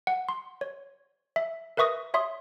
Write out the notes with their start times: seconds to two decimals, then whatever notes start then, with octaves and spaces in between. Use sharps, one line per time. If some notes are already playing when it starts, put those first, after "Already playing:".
0.07 F#5
0.29 C6
0.61 C#5
1.36 E5
1.77 A#4 B4 E5 C#6 D#6 A#6
2.14 C#5 E5 C6 D#6